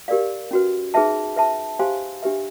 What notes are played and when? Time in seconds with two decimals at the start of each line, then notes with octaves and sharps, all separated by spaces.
0.08 G4 A#4 D5 F5
0.51 C#4 F#4 B4
0.94 D#4 G#4 B4 E5 A5
1.37 B4 E5 A5
1.79 G4 C5 F5 G#5 C6
2.23 D4 G4 B4 E5